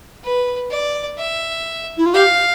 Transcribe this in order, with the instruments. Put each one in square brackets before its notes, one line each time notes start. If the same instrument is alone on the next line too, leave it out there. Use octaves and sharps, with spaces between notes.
[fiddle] B4
D5
E5
[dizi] E4
F4
[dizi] G4 [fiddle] F5